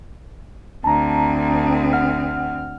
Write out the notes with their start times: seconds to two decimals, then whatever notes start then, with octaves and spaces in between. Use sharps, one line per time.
0.84 D2 C4 A5 A#5
1.93 F#5 F6